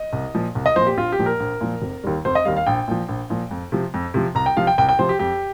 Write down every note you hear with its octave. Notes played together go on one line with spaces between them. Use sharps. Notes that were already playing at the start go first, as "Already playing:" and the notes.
Already playing: D#5
C2
A#2 F3
C2
D#5
A#2 F3 C5
G4
A#1 F4
G4
A#2 F3
A#4
A#1
A#2 F3
F1
D#2 D#3 G3
F1 C5
D#5
D#2 D#3 G3 F5
F5
A#1 G5
A#2 F3
A#1
A#2 F3
F2
C3 F3
F2
C3 F3
C2 A#5
G5
C3 F3 F5
G5
C2 G5
G5
C3 F3 C5
G4
F2 G4